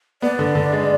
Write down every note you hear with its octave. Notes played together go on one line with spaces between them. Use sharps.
B3 D5
D3
D3
G#3